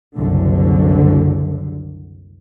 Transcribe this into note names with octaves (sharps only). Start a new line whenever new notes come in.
F#1 C2 D3